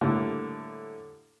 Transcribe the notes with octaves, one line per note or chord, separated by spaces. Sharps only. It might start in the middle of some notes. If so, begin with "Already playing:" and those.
A2 D3 G3 A#3 E4 A4